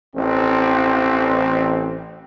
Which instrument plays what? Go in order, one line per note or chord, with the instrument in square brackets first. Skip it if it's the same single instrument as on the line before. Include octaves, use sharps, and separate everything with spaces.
[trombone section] A1 C4